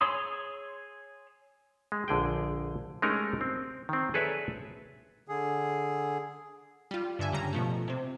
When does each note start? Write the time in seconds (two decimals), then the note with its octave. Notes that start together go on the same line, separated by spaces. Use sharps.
0.01 G#4 C#5 C6 D#6 E6
1.92 G#3
2.08 A#1 D3 G#4 G5
3.02 G#3 A3 C#4 D#4 G4 A#4
3.41 C4
3.89 D#3 C4
4.14 G#4 A4 B4 C#5 D5 E5
5.28 D3 G#4
6.91 G3 F4
7.19 G2 D3 E5 G#5
7.32 G2 C#3 G3 A#5
7.53 B2 F3 A3
7.88 C3 C4